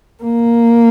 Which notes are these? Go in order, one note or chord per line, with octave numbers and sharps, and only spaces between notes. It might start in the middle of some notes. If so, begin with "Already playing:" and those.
A#3